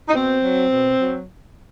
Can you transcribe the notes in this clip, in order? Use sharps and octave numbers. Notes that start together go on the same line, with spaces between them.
D#4
B2 C4
F#3
B2
F#3